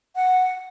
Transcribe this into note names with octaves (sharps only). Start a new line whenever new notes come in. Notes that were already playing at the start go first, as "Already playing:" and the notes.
F#5